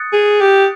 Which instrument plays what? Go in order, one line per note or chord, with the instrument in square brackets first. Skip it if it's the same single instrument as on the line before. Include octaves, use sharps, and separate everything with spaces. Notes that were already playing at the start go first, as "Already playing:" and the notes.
Already playing: [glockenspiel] D#6 F#6 A6 C#7
[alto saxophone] G#4
G4